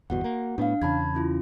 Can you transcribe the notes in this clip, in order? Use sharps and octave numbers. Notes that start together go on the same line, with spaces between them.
G1 E2 B2 F#4 F#5
A#3
A2 B3 D4 F5
E2 C#3 A5 B5 G#6
C#4 E4 F4